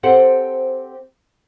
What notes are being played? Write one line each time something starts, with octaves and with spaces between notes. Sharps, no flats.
C4 G4 A4 C5 F#5